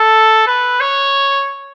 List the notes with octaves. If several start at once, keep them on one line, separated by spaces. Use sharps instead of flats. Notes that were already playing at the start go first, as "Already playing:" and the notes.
Already playing: A4
B4
C#5